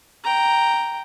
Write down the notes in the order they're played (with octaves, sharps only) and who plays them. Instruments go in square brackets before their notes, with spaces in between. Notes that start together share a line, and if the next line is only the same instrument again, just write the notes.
[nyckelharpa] G5 A#5